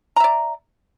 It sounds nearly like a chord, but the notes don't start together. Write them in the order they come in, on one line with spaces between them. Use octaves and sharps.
A#5 E5 D5